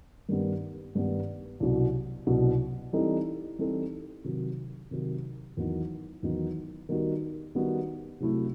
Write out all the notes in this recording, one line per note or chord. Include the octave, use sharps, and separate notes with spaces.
G2 D#3 G3 B3
G2 D#3 G3 B3
C2 B2 F#3
C2 B2 F#3
E3 G3 C4 D#4 A4
E3 G3 C4 D#4 A4
C3 D#3 F#3
C3 D#3 F#3
E2 D#3 F#3 B3 D#4
E2 D#3 F#3 B3 D#4
D#3 G3 B3 D#4 F#4
D#3 G3 B3 D#4 F#4
C3 F#3 A3 E4